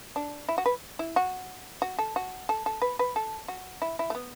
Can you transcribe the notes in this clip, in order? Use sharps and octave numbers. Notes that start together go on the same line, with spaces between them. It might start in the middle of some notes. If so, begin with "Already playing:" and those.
D4
E4
F#4
B4
E4
F#4
F#4
A4
F#4
A4
A4
B4
B4
A4
F#4
E4
E4
A3
B3